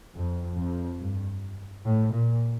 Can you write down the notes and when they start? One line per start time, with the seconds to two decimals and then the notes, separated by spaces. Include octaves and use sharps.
0.14 F2
0.57 F2
0.99 G2
1.84 A2
2.13 A#2